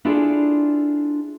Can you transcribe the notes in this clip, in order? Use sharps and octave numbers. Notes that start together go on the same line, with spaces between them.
D4 E4 F4 G#4 A4 D5